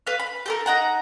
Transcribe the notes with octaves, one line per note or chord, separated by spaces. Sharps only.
B4 F5
B5
G4 A4 A#4
D#4 F#5 A#5